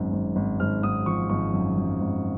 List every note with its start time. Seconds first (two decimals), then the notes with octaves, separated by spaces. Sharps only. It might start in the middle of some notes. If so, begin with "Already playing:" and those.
Already playing: G#1 F#2
0.13 G#1
0.36 G#1
0.60 G#1 F6
0.83 G#1 D#6
1.06 F3 C#6
1.29 G#1 C#6
1.54 F#2
1.77 F#2
2.01 G#1